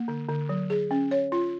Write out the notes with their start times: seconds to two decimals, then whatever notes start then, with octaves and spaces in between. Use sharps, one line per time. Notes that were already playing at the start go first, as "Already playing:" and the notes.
Already playing: A#3
0.08 D3
0.29 D3
0.49 F#3
0.70 G#4
0.91 C#4
1.11 C#5
1.32 F4